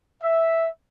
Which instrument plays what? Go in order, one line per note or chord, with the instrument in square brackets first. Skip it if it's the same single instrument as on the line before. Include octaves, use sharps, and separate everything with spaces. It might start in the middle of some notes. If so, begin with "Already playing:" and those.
[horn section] E5